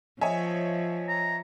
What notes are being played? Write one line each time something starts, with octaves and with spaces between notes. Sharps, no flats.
F3 C#5 D#5 E5 G#5
A#5